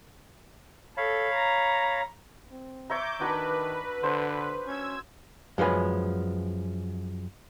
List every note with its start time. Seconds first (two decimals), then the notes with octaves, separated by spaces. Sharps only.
0.97 A4 C#5 F5 B5
1.33 A#5
2.51 C4
2.90 C#5 E5 A#5 D6 G6
3.20 D#3 D4 F#4 B4
4.03 D3 C5
4.66 C#4 E6 G#6
5.58 F#2 F3 G#3 B4 G#5